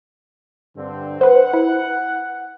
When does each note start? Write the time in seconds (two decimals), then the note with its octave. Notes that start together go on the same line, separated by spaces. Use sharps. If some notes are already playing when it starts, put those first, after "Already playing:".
0.77 G2 D3 C4
1.21 B4 C5 F#5
1.53 E4